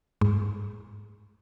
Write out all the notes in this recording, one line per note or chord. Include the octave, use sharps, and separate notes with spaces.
G#2